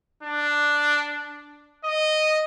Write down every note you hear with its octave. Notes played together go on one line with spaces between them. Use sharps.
D4
D#5